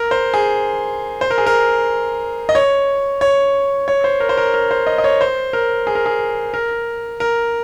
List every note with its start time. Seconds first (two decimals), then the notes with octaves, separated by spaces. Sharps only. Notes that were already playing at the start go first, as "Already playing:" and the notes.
Already playing: A#4
0.11 C5
0.34 G#4
1.21 C5
1.31 A#4
1.38 G#4
1.47 A#4
2.49 D#5
2.55 C#5
3.21 C#5
3.88 C#5
4.04 C5
4.20 A#4
4.29 C5
4.37 A#4
4.54 A#4
4.71 C5
4.87 D#5
4.98 D#5
5.04 C#5
5.21 C5
5.53 A#4
5.87 G#4
5.95 A#4
6.06 G#4
6.54 A#4
7.20 A#4